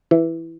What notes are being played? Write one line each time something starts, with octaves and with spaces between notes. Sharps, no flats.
E3